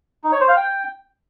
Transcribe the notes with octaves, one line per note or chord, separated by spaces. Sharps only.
D#4
C#5
C5
F5
G5